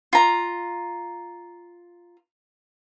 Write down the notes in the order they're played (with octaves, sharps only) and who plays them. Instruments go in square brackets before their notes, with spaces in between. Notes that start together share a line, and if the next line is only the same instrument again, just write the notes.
[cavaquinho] F4 A#5